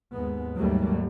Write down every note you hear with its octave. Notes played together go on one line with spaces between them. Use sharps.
D#2 G#2 G#3 B3
G#1 D#2 G#2 F#3 G3 A3